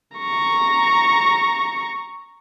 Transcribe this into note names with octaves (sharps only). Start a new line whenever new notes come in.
A#5 C#6